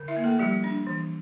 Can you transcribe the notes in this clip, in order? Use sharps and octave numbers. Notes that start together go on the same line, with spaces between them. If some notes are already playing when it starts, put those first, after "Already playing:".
Already playing: D3
E4 E5
A#3
A3 A4
F3 G3 G4
D4
E3